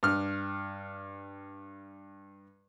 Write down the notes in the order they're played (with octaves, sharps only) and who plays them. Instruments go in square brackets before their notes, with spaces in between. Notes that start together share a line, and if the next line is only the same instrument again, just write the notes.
[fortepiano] G2 F6